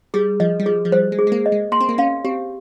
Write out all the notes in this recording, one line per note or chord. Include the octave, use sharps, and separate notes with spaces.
G3 G#4
F3 D#5
G3
F3 G#4
F3
G3 C5
G#3
G#4
G#3
A#3
D#5
G#3
A#3 C6
C4
A#3
C#4 F5
C4 G4